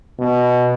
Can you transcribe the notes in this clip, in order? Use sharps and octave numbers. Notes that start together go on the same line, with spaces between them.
B2